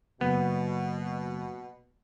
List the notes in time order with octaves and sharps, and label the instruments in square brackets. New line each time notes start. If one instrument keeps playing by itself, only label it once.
[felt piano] F#1 [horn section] B2 [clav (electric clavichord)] B3